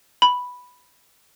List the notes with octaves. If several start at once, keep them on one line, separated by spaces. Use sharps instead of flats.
B5